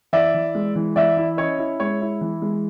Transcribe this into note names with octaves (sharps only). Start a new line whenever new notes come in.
E3 D5 E5
E3
G#3
E3
E3 D5 E5
E4
C#4 C#5 D#5
E4
G#3 C#5
E4
E3
G#3